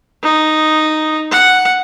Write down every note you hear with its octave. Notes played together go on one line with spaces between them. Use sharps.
D#4
F#5